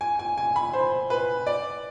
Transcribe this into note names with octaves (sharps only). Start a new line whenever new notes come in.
G#5
G#5
G#5
B5
C5
B4
D5